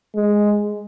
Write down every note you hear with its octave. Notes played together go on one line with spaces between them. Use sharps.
G#3